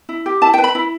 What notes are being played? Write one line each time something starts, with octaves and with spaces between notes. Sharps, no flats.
E4
G4
E4 A5
G5
B4
B5
E4